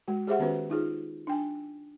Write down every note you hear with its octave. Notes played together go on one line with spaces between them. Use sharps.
G#3 F#4
G4 G#4 C5 E5 F#5
D#3 B3 C#4 F#4 B4 C5
D#4 F4 G#4
D4 G5 G#5